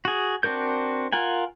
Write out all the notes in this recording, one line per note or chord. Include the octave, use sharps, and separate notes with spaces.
F#4 G#4
C4 D4 F#4 A#4 G6
F4 A#4 F#5 G#5